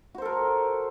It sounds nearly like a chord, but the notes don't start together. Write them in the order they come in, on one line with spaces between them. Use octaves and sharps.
F#4 C5 A4 A#4